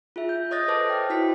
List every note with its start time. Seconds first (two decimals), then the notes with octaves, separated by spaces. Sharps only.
0.16 F4 G#4 E5
0.29 G6
0.51 C#5 D#5 D#6 F#6 A6 A#6
0.68 A4 B4 C5 A5 D6
0.89 G5 F6
1.10 E4 F#4 C5 B6